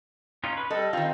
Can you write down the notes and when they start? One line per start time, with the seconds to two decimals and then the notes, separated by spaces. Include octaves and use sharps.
0.44 C#4 D#4 F4
0.57 B4
0.70 G3 A4 D#5
0.93 D#3 C4 F4